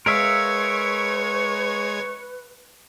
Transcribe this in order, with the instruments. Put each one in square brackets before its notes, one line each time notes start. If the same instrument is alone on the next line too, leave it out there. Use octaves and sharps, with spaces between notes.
[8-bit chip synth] G#3 C#5 G#6 [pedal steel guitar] A#4 E5 F5 [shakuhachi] B4 [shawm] C#6